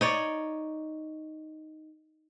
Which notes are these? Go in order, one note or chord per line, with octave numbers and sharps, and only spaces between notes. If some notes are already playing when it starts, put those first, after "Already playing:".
D#4 C#5 D5